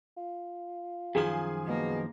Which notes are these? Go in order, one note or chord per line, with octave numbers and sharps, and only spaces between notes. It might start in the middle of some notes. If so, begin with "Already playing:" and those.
F4
F#2 D#3 F3 G#4 G#5
B2 A#3